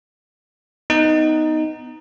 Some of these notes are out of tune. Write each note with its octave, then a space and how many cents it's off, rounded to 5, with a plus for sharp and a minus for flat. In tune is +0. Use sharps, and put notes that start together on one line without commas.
B3 +15 D#4 +0